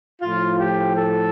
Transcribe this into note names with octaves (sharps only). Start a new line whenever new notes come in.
A2 F3 F4
G4
A4